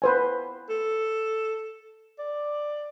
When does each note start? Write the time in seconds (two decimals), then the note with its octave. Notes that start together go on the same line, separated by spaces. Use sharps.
0.02 B4 C5 G#5
0.69 A4
2.19 D5